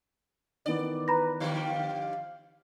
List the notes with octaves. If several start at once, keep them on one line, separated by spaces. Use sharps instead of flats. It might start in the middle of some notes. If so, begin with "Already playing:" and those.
D#3 E3 B3 D5
B4 A#5 B5 A#6
D3 F3 G3 F5